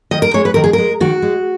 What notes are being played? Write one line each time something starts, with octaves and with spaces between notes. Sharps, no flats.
D#3 D#5
A#4
G#3 C#5
B4
D#3 A#4
G#4
G#3 A#4
D#3 F#4
G#3